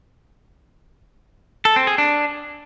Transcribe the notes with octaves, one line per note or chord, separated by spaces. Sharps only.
A4
C4
G#4
D4